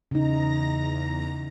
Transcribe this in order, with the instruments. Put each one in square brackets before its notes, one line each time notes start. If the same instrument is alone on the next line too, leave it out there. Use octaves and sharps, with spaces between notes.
[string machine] E2 A#5 A#6 [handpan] C#3 D#4